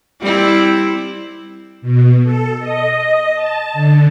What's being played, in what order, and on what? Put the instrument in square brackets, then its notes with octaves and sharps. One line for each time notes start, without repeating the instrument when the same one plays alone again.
[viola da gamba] G3 C4 E4
[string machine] B2
A4
D#5
D#5
A5
D3